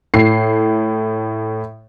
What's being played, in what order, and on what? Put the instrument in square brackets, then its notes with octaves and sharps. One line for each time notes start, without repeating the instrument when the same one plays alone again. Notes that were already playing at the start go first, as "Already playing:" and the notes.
[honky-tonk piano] A2 C7